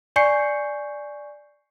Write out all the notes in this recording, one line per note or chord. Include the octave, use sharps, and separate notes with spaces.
D5 G#5 C#6 G6 C7 C#7